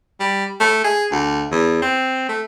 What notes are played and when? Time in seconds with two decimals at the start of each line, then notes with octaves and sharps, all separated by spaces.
0.20 G3
0.60 A3
0.84 G#4
1.12 D2
1.52 E2
1.82 C4
2.29 A3